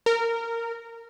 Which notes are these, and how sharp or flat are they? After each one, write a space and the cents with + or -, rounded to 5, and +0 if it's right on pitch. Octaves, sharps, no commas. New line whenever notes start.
A#4 -15